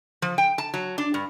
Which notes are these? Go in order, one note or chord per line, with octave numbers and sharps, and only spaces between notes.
F3
G5
A5
F#3
D4
G2